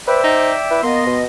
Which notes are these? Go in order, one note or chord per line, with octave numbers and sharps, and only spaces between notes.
B4 C5 D5 E5 G5
D#4
E4 B4
A#3 B3 D#5 C6
B2